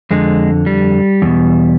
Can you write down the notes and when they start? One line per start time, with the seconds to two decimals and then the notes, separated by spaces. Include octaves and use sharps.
0.11 F2 D3 G#3
0.66 G3
1.22 E2 B2